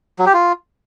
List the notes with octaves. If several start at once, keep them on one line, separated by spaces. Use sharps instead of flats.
F#3
G4
F4